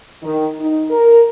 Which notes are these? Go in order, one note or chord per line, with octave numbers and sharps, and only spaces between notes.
D#3
D#4
A#4